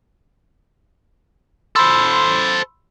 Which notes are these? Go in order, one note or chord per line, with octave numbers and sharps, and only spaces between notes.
A4 C5 B5 C6 E6